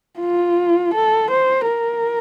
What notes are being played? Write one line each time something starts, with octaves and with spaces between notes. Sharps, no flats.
F4
A4
C5
A#4